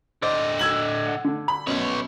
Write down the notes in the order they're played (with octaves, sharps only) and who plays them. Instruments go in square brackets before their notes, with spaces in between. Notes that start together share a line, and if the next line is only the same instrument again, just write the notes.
[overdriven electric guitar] D3 D#5 [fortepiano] C5 D5
[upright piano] E6 G#6 F#7
[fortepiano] F#5
D3
[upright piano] B5
[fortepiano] F#2 B2 [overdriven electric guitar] B4 C#5